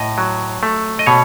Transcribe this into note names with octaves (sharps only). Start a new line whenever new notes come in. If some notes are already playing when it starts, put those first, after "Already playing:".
Already playing: A2 D#5
F#3
A3
D#5
B2 C#5